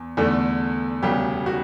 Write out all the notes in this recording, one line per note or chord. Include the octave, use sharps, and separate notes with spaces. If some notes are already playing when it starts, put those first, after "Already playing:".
Already playing: E2
E2 D3 A3
E1 D2 C#3 G3 G4
F#4